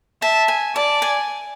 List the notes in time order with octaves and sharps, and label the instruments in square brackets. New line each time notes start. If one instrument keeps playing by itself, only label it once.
[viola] E5 [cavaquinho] A5
[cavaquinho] G#5
[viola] D5 [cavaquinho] A5
[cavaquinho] G#5